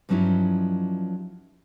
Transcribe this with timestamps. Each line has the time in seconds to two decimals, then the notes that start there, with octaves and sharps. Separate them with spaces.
0.09 G2 F3 F#3 C#4 D#4 E4